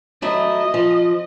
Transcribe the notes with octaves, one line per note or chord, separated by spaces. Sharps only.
F#3 A3 E4 D#5
F3